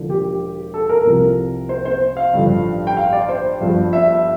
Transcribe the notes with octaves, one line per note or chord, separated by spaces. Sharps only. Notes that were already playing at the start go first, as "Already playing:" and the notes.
Already playing: E1 E2 D3 F3
G4
A4
A#4
C2 C3 F3
C5
C5
F5
A1 G2 D3 F3
G5
F5
D5
C5
G1 G2 F3
E5